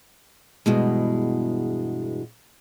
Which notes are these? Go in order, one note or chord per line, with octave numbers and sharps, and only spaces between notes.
E2 G2 B2 G#3